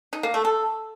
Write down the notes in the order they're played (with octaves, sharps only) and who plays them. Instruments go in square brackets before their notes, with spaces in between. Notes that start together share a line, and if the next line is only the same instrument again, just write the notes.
[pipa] D#4
A#3
A3
A4